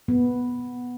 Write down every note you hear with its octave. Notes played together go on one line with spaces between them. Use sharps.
B3